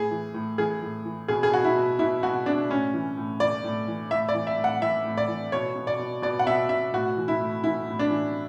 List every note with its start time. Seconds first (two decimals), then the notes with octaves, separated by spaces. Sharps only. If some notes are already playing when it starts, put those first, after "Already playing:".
Already playing: A2 G#4
0.11 E3
0.34 A2
0.58 E3 G#4
0.82 A2
1.05 E3
1.28 B2 G#4
1.43 G#4
1.52 B2 F#4
1.64 E4
1.76 B2
1.99 B2 E4
2.23 B2 F#4
2.46 B2 D4
2.70 A2 C#4
2.94 E3
3.17 A2
3.40 E3 D5
3.64 A2
3.88 E3
4.11 A2 E5
4.29 D5
4.34 E3
4.47 E5
4.58 A2
4.64 F#5
4.81 E3 E5
5.05 A2
5.18 D5
5.28 E3
5.52 B2 C#5
5.76 B2
5.87 D5
5.99 B2
6.22 B2 D5
6.39 F#5
6.46 B2 E5
6.69 B2 E5
6.94 A2 F#4
7.17 E3
7.28 E4
7.41 A2
7.64 E3 E4
7.88 A2
7.99 D4
8.10 E3